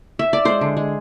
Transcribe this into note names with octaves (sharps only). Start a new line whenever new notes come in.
E5
D5
G#3 C5
D3
G#3